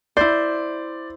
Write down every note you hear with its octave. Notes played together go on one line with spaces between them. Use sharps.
E4 C5 D5